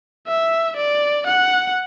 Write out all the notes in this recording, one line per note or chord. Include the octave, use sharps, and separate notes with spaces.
E5
D5
F#5